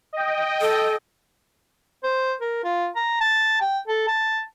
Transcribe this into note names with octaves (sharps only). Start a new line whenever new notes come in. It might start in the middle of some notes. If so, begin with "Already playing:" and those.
D#5 G5
A4
C5
A#4
F4
A#5
A5
G5
A4
A5